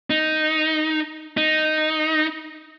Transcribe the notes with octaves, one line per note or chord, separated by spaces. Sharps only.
D#4
D#4